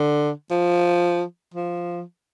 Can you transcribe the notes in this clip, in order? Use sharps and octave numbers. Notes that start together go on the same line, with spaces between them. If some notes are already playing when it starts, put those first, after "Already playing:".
Already playing: D3
F3
F3